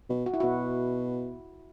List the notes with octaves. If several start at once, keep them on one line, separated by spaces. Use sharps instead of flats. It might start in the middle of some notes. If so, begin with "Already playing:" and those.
B2
F#4
E4
B2 F#4